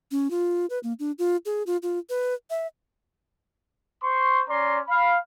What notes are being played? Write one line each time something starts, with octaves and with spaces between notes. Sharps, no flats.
C#4
F4
B4
A#3
D4
F4
G#4
F4
F4
B4
E5
C5 C6 C#6
C#4 D5 A#5 C6
F5 B5